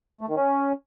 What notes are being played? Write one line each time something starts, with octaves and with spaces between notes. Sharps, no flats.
A3
D#3
C#4